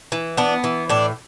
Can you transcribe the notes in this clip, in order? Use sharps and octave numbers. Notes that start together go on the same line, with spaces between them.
E3
B3 D4
E3
A2 D4